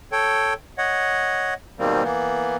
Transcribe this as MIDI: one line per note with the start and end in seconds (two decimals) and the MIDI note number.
0.12 0.53 69
0.12 0.53 73
0.12 0.53 79
0.78 1.54 73
0.78 1.54 75
0.78 1.54 78
1.79 2.03 44
1.79 2.03 47
1.79 2.03 51
1.79 2.03 55
1.79 2.03 58
1.79 2.03 60
2.03 2.56 52
2.03 2.56 58
2.03 2.56 59